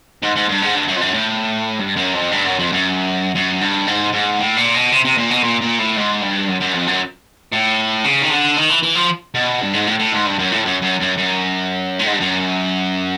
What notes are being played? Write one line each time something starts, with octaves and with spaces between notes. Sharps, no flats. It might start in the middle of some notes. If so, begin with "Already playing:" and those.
G#2
G#2
G2
G#2
G2
F#2
F2
F#2
A2
G2
F#2
F2
G2
F#2
F2
F#2
F#2
G2
G#2
G#2
A2
A#2
B2
C3
C3
A#2
B2
A#2
A#2
A2
G#2
G2
F#2
F#2
F2
F#2
A2
C#3
D#3
D3
D#3
E3
E3
F3
B2
G2
G#2
A2
A2
G#2
G2
F#2
A2
F#2
F#2
F#2
F#2
A2
G#2
G2
F#2